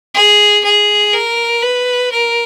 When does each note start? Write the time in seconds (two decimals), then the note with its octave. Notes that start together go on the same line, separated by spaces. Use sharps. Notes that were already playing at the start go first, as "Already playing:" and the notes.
0.14 G#4
0.64 G#4
1.13 A#4
1.63 B4
2.12 A#4